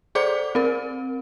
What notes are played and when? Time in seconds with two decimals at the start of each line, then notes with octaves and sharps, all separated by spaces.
0.15 G#4 A4 C5 D5 D6
0.55 C4 A#4